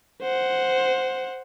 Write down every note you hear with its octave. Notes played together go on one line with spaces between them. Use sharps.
C5 F#5